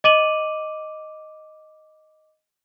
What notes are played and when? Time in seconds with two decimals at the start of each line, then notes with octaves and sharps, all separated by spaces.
0.04 D#5 D6 D#7 F#7